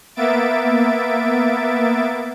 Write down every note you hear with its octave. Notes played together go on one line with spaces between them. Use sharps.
A#3 B3 E5 A6 D7